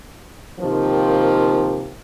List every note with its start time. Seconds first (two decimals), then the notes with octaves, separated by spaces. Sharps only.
0.60 C3 D#3 F3 A#3